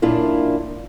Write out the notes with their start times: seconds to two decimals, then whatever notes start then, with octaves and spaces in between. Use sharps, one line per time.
0.02 F#2 A#2 D4 E4 F4